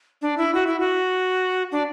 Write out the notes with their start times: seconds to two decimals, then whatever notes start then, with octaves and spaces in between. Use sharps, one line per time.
0.22 D4
0.38 E4
0.55 F#4
0.67 E4
0.80 F#4
1.72 D4